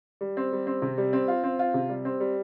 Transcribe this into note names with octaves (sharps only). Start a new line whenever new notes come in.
G3
C4
G3
C4
C3
G3
C4
F4
C4
F4
C3
G3
C4
G3